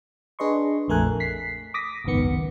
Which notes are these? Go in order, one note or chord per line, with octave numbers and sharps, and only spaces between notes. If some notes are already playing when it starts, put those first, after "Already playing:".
D4 G#4 B4 D#5 C6 C#6
A#1 F2 A3 A#4 G#5 F#6
B6 C7
D6 D#6 A#6 B6
G#1 C#2 F#2 D#3 B3 C#7